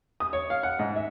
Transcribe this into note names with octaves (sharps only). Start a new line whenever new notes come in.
D#6
C#5
F5
F#5
G#2
E5